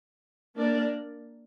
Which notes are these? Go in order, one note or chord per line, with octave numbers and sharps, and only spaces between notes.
A#3 D4 A#4 D5